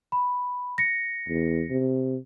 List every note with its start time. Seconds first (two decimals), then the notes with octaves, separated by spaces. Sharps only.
0.12 B5
0.78 A#6 C#7
1.29 E2
1.70 C3